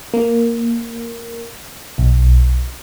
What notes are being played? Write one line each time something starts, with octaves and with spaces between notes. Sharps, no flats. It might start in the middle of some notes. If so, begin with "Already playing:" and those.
A#3
B1